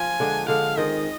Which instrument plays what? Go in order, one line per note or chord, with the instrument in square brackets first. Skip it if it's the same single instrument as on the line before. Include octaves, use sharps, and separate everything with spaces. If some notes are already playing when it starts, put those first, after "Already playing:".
Already playing: [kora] F3 F4 [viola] G#5
[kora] D3 G#3 D4
[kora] D3 G#3 D4 [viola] F5
[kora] D#3 G#3 C4 [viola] D#5